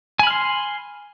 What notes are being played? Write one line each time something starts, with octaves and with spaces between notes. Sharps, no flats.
G#5 B5 C6 F6